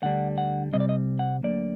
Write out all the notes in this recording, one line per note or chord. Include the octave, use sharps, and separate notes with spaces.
D2 D3 G3 D4 F#5
F#5
C2 C3 G3 C4 D#5
D5
D#5
F#5
D2 D3 F#3 A#3 D5